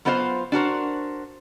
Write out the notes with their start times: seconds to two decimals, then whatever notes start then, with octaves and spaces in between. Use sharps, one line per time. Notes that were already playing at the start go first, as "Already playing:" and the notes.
0.05 F#3 B3 F4 C5 D#5 F5
0.52 D4 F#4 A#4 C5